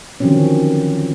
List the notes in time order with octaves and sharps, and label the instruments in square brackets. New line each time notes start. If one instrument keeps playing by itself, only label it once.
[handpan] D3 D#3 F3 F#3 C4 C#4